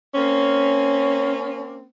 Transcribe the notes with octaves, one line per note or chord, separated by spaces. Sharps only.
A#3 C4 C#4